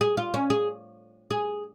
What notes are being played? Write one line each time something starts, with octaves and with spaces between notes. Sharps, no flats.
G#4
F4
C#4
G#4
G#4